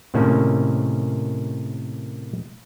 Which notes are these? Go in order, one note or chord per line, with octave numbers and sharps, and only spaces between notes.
A2 C3 D#3 A#3 C#4